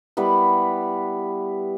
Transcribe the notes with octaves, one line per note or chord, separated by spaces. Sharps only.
G3 B3 E4 B4